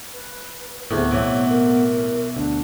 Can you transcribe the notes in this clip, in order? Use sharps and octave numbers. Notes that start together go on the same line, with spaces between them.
B4
D2 A2 C3 B3 G#4
B1 E3 C#5
A#4
D2 D4